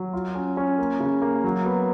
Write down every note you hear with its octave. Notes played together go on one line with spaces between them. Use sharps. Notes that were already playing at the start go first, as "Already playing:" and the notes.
Already playing: F#3
F4
C#4
C#4
A#3
C#3
A#3
F#3
B3